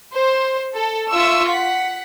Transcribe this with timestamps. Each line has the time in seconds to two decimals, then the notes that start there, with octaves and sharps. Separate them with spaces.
0.15 C5
0.75 A4
1.10 F4 E5 C#6 E6
1.49 F#5 B6